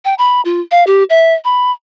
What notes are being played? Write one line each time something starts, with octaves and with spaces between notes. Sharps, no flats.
G5
B5
F4
F5
G4
E5
B5